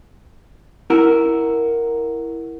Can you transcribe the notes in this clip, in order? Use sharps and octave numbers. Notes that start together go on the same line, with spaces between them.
E4 F#4 A#4